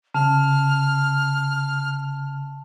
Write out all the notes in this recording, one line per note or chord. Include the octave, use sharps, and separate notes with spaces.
C#3 A5 F6